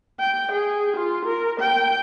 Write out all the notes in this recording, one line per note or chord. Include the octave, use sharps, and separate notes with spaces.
G5
G#4
F4
A#4
G5